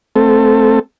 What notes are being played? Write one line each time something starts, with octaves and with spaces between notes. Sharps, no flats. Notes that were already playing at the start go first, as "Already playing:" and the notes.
A3 C4 A4